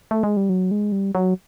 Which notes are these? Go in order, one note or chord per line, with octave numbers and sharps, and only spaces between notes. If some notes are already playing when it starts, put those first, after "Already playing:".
A3
G#3
G3
F#3
G#3
G3
F#3